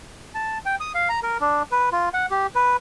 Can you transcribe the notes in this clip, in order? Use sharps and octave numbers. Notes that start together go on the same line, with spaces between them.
A5
G5
D#6
F5
A#5
A#4
D4
B4
F4
F#5
G4
B4